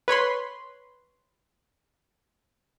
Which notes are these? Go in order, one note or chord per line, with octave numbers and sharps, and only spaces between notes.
B4 C#5 B5 C6